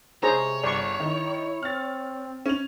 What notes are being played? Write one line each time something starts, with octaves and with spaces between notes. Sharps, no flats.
C3 G#4 C5 C#5 A#5
G1 D5 C#6
D#3 E4
C4 F6 A6
C#4 F7